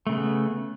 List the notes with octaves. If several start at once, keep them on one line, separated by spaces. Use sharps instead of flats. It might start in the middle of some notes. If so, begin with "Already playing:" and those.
C#3 A3 B3